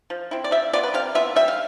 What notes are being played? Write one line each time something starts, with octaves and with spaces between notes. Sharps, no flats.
F3
C4 E4
D5
F3 E5
B3 F4 D5
B4
C3 F5
E3 B3 F4 E5
G3 E5
F5